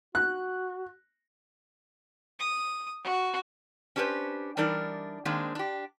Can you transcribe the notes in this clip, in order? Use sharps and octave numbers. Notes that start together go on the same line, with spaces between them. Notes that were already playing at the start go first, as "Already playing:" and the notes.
F#4 F#6
D#6
F#4
C#4 D4 G4 G#4 B4 C5
E3 G3 D4 D#4 A#4 D5
D#3 G#3 A#3 C4 D4
D4 G4